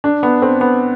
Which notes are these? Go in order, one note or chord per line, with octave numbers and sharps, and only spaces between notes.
D4
B3
C4
B3